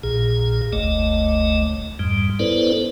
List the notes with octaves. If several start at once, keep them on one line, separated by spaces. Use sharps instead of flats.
A#1 A#2 G#4
F#1 D2 A3 D#5
F2 G#2 G3
B3 E4 A4 B4 C5 D5